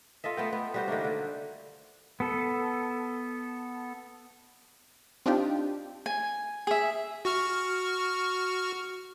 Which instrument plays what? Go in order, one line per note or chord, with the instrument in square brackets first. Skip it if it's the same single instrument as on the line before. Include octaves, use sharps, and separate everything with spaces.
[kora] F4 A4 D#5 E5
A3 B3 G5
B3
G3 F#4 C5
D#3 A3 A#3 D4
D3
[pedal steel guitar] B3 A4
[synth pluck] C4 D4 D#4 F4 G4
[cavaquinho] G#5
G#4 E5
[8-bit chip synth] F#4 C#6 F6